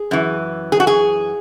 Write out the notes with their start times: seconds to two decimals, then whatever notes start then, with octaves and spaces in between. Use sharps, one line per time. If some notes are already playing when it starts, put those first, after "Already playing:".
Already playing: G#4
0.11 F#2 E3
0.72 G#4
0.80 F#4
0.87 G#4